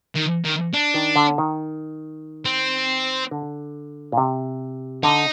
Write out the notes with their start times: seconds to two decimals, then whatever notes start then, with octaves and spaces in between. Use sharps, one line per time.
0.16 D#3
0.45 D#3
0.73 D4
0.94 D#3
1.16 D3
1.38 D#3
2.45 C4
3.31 D3
4.12 A#2
4.17 C3
5.03 D3 D#4